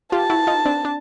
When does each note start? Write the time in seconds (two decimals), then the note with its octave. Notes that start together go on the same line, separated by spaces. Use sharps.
0.12 F4 G4 A5
0.30 E4 F#4
0.47 D#4 F4
0.65 C4 D4
0.85 D4